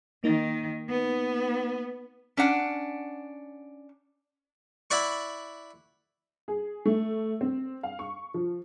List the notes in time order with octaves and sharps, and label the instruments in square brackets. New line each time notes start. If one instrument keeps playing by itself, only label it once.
[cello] D#3 [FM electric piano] A#3 D#4
[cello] B3
[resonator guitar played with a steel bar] C#4 D4 F#5
[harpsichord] E4 D5 F#5 C#6
[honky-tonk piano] G#4
A3
C4
F5
C#6
F3